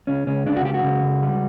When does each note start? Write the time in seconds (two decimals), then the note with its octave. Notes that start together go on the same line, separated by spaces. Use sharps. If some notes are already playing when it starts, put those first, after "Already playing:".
0.07 C#2 C#4
0.27 C#2 C#4
0.46 C#3 D4
0.56 F#4
0.64 C#2 G4
0.74 F#4
0.84 C#3
1.03 C#2
1.23 G3